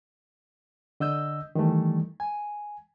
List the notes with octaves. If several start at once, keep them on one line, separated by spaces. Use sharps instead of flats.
D3 D#5 E6 G6
D#3 E3 G3 A3
G#5